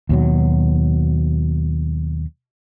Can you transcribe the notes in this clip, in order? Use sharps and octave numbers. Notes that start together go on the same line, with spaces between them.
D#2 B2 F#3